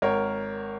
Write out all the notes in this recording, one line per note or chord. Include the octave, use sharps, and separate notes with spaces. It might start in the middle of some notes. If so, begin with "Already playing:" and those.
G#1 A#4 C#5